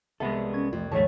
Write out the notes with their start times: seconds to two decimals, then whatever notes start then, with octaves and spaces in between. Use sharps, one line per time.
0.20 C2 G#3 B3 A4 E5 F#5 B5
0.53 C#4 C#6 G#6
0.73 F2 A3 F4
0.91 A#1 D#2 G#2 A3 C#5 A5 C#6